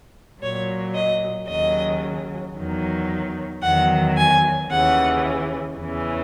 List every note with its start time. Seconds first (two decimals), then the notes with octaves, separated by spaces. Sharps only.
0.41 A#2 F#3 C#5
0.95 D#5
1.48 D#2 C#3 F#3 D#5
2.56 E2 D#3 F#3
3.63 E2 D#3 F#3 F#5
4.17 G#5
4.69 D#2 C#3 E3 F#5
5.77 E2 C#3 E3